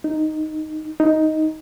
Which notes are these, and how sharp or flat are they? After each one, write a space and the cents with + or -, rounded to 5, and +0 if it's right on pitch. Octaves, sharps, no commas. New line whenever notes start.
D#4 -5
D#4 +5